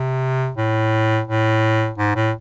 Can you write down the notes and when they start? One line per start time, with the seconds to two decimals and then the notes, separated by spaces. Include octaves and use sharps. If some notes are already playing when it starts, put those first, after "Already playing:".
Already playing: C3
0.57 A2
1.27 A2
1.98 G#2
2.16 A2